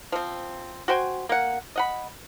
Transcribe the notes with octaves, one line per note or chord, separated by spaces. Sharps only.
F3 C4
F#4 C5 G5 G#5
A#3 F#5
D#5 F#5 B5